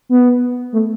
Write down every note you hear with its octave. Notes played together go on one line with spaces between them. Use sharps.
B3
A3